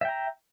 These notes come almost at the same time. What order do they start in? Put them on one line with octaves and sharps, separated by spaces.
E5 G5 A#5